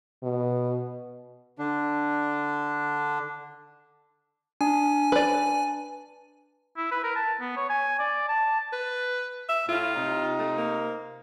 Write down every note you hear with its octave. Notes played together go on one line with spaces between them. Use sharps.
B2
D3 D4
D4 G#5
B4 D5
E4
B4
A#4
A5
B3
C#5
G#5
D5
A5
B4
E5
A2 F4
C3 D#4
A3
A#3